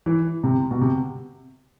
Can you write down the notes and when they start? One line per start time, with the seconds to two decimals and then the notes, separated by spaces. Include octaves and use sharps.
0.06 E3
0.44 C3
0.71 B2
0.81 C3